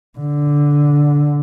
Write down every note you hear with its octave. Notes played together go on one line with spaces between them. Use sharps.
D3